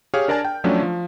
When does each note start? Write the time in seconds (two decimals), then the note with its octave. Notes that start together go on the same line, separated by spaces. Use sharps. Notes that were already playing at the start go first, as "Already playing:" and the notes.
0.14 G4 G#4 C#5 F5 F6
0.28 D4 A#4 D5 G#5 A5
0.45 G5
0.64 F3 F#3 A3 C#4 D4
0.83 F3